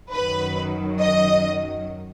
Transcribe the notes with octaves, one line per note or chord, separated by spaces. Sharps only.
F#2 D#3 F#3 B4
D#5